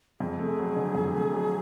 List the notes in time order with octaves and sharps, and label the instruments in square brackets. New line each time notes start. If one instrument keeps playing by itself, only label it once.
[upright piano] F2 [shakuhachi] G#4
[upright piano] A3
F#3
D3
F2
A3
F#3